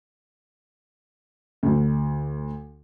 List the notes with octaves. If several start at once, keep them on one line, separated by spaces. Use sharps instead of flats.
D2